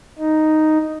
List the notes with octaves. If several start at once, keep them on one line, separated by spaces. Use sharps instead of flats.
D#4